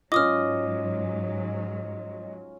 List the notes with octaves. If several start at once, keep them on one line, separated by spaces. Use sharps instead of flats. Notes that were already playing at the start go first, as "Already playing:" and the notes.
G#2 F#3 C#4 F4 D#5 D6 D#6 F6